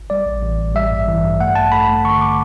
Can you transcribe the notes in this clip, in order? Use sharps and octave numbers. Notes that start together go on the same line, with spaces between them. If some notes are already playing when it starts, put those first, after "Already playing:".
Already playing: G1
G3 D5
A1
A1
A1
G3 E5
G2
E3
G2
A3 F#5
A1 A5
A3 B5
A3
D3 C#6
D3 D6